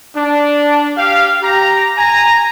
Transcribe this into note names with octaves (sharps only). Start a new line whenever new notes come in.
D4
G4 F5
G4 A#5
G#5 A#5